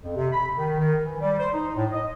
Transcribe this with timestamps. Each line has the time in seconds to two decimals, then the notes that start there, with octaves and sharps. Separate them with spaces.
0.03 F2
0.16 C3
0.32 B5
0.56 D#3
0.78 D#3
1.02 E3
1.20 G3
1.39 C5
1.53 D#4
1.75 A2
1.91 D#5